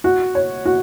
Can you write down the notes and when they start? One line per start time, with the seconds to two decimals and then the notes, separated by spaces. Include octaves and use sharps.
0.04 F#4
0.35 C#5
0.66 F#4